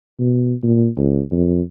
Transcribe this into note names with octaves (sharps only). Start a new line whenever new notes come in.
B2
A#2
C#2
F2